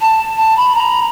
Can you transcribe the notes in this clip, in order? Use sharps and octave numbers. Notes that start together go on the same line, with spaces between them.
A5
A5
B5
A#5